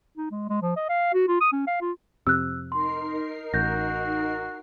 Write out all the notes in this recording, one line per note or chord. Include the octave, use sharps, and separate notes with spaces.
D#4
G#3
G#3
F3
D#5
F5
F#4
F4
D#6
C#4
F5
F4
F2 C3 E6 F#6
D#4 A#4 C6 C7
A1 F#4 G6 A#6